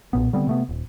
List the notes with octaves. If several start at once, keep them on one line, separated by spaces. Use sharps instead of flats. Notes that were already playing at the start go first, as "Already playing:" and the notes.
B1 A#2 B3
D3 G3 B3 C4
C3 A3 B3
D#1